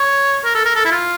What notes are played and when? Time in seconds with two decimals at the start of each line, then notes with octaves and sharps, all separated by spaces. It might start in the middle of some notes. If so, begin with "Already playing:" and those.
Already playing: C#5
0.45 A#4
0.55 A4
0.65 A#4
0.75 A4
0.85 E4
0.91 F4